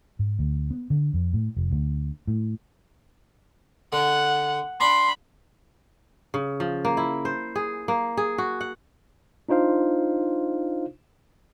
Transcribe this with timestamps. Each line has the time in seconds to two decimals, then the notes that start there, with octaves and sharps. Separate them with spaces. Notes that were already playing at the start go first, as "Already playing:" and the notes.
0.19 G#2
0.39 D2
0.70 B3
0.90 D3
1.14 F2
1.33 A2
1.57 F1
1.71 D2
2.27 A2
3.93 D3 F#5
4.81 D4 B5 C6
6.34 C#3
6.60 F3
6.85 A#3
6.97 E4
7.25 C5
7.56 G#4
7.88 A#3
8.17 G#4
8.38 F#4
8.61 F#5
9.49 D4 D#4 F4 C5 F5